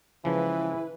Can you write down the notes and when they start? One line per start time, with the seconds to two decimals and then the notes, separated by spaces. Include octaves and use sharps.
0.25 C#3 E3 F3 G#3 E4 B4